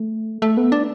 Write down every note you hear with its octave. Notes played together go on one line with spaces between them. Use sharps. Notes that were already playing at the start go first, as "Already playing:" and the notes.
Already playing: A3
A3
B3
D4